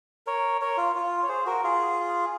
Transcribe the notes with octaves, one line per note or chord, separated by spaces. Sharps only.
A#4 C#5
A#4 C#5
F4
F4
C#5
G#4 C5
F#4 A#4
F4 G#4